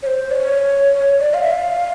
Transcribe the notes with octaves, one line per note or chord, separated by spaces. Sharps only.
C#5
C5
D5
C#5
D5
F5
E5
F5